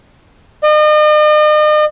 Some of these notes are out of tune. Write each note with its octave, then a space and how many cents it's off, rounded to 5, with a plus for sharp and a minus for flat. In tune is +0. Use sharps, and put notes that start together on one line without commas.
D#5 -40